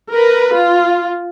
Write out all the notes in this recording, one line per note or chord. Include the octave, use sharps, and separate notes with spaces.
A#4 B4
F4